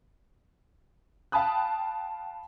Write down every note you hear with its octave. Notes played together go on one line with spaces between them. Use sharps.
F5 G5 A5 B5 D#6 F#6